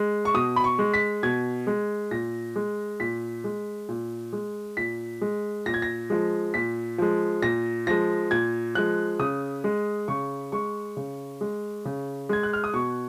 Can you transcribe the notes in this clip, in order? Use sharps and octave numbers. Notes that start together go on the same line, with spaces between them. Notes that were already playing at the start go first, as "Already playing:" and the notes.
Already playing: G#3
C#6
B2 D#6
B5
C#6
G#3
B6
B2 G#6
G#3
A#2 A#6
G#3
A#2 B6
G#3
A#2
G#3
A#2 B6
G#3
A#2 A#6
G#6
A#6
F3 G#3
A#2 B6
F3 G#3
A#2 A#6
F3 G#3 A#6
A#2 G#6
F3 G#3 F#6
C#3 D#6
G#3
C#3 C#6
G#3 C#6
C#3
G#3
C#3
G#3 G#6
F#6
F6
D#6
B2 C#6